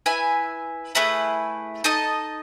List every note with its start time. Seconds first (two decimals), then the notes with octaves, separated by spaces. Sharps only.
0.06 E4 B4 E5 G#5
0.95 A3 E4 G#4 B4
1.84 D#4 A4 D#5 A5